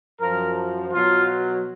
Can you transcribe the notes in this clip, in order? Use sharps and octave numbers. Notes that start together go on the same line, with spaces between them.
F#2 F3 A#4
B2 F#3 F4